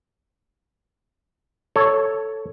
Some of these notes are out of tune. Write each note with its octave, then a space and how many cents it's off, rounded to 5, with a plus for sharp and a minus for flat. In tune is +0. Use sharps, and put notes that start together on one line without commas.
A4 +0 C#5 +0